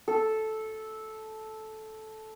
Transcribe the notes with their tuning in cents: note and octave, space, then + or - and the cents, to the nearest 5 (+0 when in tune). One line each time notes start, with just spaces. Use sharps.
A4 -10